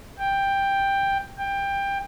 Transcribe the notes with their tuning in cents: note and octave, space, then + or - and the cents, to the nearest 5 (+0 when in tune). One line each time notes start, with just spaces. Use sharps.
G5 +10
G5 +20